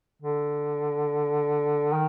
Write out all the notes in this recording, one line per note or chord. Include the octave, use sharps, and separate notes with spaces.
D3
D#3